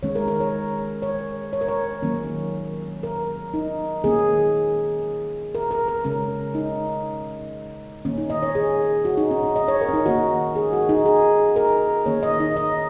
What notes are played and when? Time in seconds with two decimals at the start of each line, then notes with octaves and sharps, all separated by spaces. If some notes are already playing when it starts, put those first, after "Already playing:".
0.03 D#3 G#3 C#4 C#5
0.15 A#4
0.28 A#4
0.40 C#5
1.02 C#5
1.53 C#5
1.61 A#4
1.69 C#5
2.03 D#3 F#3 A#3 C#4
3.03 A#4
3.54 D#4
4.04 D#3 A#3 C#4 G#4
5.55 A#4
5.71 A#4
5.88 A#4
6.05 C#3 G#3 C#4 A#4
6.55 D#4
8.05 D#3 A#3 C#4
8.18 D#4
8.30 D#5
8.43 C#5
8.55 G#4
9.05 F#4
9.17 D#4
9.31 C#4
9.43 C#4
9.56 D#5
9.68 C#5
9.81 A#4
9.88 C#4
9.93 D#4
10.05 D#3 A#3 C#4 F#4
10.56 G#4
10.73 F#4
10.89 D#4
11.06 G#4
11.56 A#4
12.06 D#3 A#3 C#4 C#5
12.23 D#5
12.40 D#4
12.57 D#5